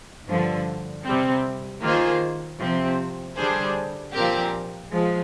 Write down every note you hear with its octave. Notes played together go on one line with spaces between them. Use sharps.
G2 D3 F3
C3 G3 C4
D#3 A#3 F4 G#4 C5
C3 F3 C4
D3 G3 D4 G#4 C5
A#2 F3 C4 G4 A#4
F3 G#3